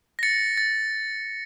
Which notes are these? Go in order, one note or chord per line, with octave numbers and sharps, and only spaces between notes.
A#6
A6 C#7
A6